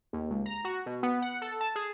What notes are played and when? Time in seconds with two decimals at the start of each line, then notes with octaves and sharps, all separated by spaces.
0.13 D#2
0.31 C#2
0.46 A#5
0.65 F#4
0.86 B2
1.03 B3
1.22 F#5
1.42 A4
1.61 A5
1.76 G#4